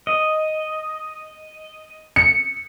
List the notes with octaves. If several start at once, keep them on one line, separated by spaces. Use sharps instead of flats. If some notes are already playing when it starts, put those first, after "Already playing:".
D#5
C#7